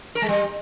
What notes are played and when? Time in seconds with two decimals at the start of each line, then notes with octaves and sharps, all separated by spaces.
0.15 A#4
0.22 G#3
0.29 G3